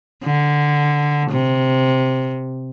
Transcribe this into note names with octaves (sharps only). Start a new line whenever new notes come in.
D3
C3